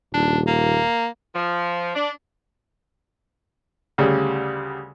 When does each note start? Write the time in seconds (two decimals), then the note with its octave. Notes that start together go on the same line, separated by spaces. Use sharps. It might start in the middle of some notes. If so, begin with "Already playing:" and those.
0.14 D#1 D4
0.47 A#3
1.34 F3
1.95 D4
3.98 D2 C#3 G3